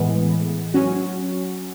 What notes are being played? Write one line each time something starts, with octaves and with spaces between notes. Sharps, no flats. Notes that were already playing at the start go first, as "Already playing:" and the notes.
Already playing: A2 E3 G#3 B3
F#3 C#4 F#4